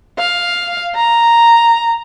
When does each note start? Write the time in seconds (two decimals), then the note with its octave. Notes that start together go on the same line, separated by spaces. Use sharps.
0.18 F5
0.95 A#5